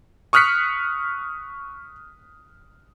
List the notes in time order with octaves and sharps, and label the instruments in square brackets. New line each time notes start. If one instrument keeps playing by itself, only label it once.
[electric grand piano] C#6 D#6 F6 F#6 B6 C#7